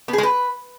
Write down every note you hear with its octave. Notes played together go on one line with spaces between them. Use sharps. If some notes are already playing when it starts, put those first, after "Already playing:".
B3
G#4
G#3
B4